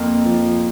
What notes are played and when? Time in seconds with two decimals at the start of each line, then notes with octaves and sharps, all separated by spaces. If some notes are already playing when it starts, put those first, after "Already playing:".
Already playing: F2 A#3
0.26 F3